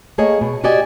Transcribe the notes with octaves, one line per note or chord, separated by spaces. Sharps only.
A3 A#3 G#4 C#5 D#5
B2
F#4 G4 D5 D#5 G#5